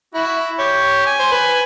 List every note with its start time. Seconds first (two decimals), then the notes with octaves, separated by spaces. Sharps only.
0.14 E4 F#4
0.59 G4 C#5
1.06 G#5
1.19 C5
1.32 B4